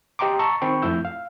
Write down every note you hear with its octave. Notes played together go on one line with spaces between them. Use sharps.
G4 D#5 G5 A#5 C6 D6
A5 A#5 C#6 E6 A6
D#3 C4 G5 B5 C#6
F2 A3 E4 E6 G6
F5